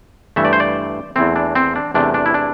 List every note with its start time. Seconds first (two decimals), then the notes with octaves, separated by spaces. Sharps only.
0.36 G2 E3 A3 E5
0.45 D5
0.53 C5
0.60 D5
1.16 E2 E3 A3 C4
1.36 D4
1.55 C4
1.76 D4
1.94 E2 C3 A3 D4
2.14 D4
2.26 E4
2.34 D4